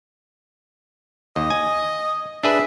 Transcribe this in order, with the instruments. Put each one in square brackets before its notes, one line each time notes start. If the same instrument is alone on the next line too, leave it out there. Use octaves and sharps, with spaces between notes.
[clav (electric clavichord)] D#2 [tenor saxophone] D#5
[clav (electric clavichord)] G#5
[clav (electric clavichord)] D4 G#4 B4 [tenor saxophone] E5